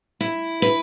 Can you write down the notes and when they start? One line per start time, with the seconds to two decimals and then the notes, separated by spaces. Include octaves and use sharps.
0.21 E4
0.62 B4